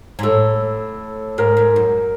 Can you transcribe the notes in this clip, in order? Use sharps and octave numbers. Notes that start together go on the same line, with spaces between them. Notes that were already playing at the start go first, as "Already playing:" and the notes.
G#2
A2 A4
G#2 A#4
G#2
F#2